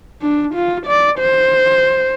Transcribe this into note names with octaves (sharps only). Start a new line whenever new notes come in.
D4
F4
D5
C5